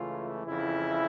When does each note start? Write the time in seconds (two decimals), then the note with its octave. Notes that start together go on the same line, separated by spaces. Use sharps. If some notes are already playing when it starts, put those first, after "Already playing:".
Already playing: C#2 C#3 E3 A3 F4
0.47 F2 C#3 E3 E4